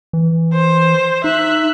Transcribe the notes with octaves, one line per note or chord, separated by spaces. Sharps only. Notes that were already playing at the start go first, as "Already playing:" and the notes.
E3
C5
D#4 E5 F#6